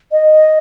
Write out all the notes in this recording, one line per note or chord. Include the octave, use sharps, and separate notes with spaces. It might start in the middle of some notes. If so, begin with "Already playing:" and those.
D#5